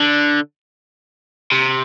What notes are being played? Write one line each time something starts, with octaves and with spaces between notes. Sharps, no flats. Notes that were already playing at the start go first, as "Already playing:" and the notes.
Already playing: D3
C3